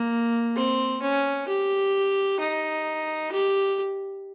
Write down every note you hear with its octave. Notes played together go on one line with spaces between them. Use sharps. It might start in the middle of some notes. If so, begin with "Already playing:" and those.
Already playing: A#3
C4
C#4
G4
D#4
G4